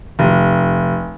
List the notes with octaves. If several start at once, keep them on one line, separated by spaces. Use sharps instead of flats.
F1